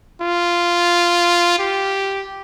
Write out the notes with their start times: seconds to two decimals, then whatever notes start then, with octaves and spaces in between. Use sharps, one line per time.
0.21 F4
1.59 G4